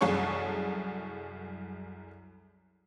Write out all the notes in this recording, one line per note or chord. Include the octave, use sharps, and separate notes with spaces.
C2 F#2 G#4 A4 C#5 C#6